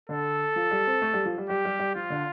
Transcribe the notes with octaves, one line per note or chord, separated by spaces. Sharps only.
D3 A4
F3
G3
C4
A3
G3
F3
G3
G3 G4
G3
G3
F3 F4
D3